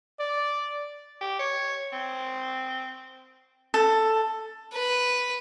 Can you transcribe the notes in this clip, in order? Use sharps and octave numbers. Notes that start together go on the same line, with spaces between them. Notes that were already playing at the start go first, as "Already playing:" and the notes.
D5
G4
C#5
C4
A4
B4